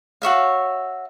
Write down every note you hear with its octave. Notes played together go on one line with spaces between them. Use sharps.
F#4 C#5 E5 F5